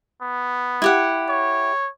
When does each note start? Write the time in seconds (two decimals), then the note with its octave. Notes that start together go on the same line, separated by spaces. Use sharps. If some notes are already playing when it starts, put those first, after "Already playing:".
0.22 B3
0.82 E4 G4 F#5
1.29 C#5